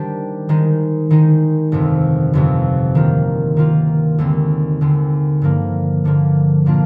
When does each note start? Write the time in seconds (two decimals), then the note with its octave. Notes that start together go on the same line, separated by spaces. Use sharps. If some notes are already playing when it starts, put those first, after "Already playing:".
Already playing: D#3 G3 D4 G4 C5
0.49 D#3 G#3 D#4
1.10 D#3 G#3 D#4
1.72 G1 F2 C3
2.33 G1 F2 C3
2.95 D#3 A#3 F4
3.57 D#3 A#3 F4
4.18 D#2 D3 G#3 C4
4.81 D#2 D3 G#3 C4
5.42 G2 D3 F3 A#3
6.04 G2 D3 F3 A#3
6.66 A#2 F3 A#3 D4 F4